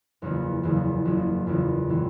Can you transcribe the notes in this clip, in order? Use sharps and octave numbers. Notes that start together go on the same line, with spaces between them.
F#1 E2 C#3 F3 A#3
F#1 E2 C#3 F3 A#3
F#1 E2 C#3 F3 A#3
F#1 E2 C#3 F3 A#3
A2 E3 G#3 B3